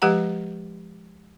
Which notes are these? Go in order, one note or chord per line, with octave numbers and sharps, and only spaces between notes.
F3 G#3 G4 B4 F#5 A#5